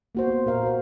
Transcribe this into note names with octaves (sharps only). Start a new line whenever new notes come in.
A#3 F#4 C5
B3 F#4
A#2 A#4 F5
F#4 C5